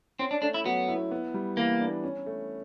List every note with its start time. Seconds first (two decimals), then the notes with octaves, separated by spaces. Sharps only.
0.19 C4 C#4
0.31 D4
0.42 A3 D4
0.54 E4
0.65 F#3 B3
0.88 E4
1.11 B3
1.34 G3
1.57 E3 A#3
1.81 D4
2.04 C#4
2.26 A3